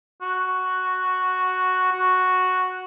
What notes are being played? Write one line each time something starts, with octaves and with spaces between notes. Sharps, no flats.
F#4
F#4